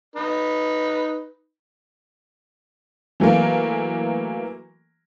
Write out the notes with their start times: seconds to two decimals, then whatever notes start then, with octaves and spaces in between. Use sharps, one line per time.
0.16 D#4 B4
3.20 E3 F#3 A3 A#3